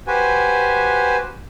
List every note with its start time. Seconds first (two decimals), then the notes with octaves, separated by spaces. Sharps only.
0.07 F#4 G4 B4 C5 G#5